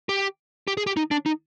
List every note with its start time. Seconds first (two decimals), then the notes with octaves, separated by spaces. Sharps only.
0.09 G4
0.68 G4
0.77 G#4
0.87 G4
0.97 D#4
1.11 D4
1.26 D#4